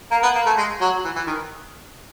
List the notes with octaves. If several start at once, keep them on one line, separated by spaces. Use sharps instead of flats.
A#3
B3
A#3
A3
G#3
F#3
E3
E3
D#3